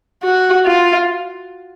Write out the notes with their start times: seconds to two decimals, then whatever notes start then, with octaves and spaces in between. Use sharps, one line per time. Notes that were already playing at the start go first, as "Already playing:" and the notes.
0.24 F#4
0.66 F4